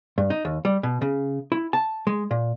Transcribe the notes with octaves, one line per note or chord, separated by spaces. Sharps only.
G2
D#4
D#2
G3
B2
C#3
E4
A5
G#3
A#2